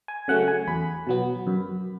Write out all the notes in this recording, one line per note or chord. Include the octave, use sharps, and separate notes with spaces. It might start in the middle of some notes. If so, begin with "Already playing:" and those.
G#5
C#3 F#3 A3 C#4 F#5
G#5
E2 B5
B2 F#3 B3
F#2